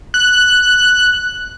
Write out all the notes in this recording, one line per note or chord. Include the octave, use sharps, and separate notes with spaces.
F#6